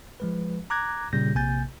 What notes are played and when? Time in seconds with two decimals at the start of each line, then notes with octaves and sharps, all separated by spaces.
0.20 F3 G#3 B4
0.70 A#5 D6 F#6 G#6 A#6
1.13 A#2 C#3 G3 G4 G6 A#6
1.35 A#1 C3 A#3 G#5 G6 A6